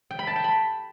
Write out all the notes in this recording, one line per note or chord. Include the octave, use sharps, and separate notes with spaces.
G5
B5
A5
G5
B5